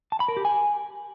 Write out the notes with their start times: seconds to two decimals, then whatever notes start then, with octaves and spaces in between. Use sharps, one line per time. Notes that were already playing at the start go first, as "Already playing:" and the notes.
0.12 A5
0.20 B5
0.28 A#4
0.37 G4
0.45 G#5